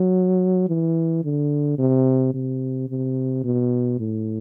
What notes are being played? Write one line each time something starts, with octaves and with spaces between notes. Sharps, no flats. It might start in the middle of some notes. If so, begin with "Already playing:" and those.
Already playing: F#3
E3
D3
C3
C3
C3
B2
A2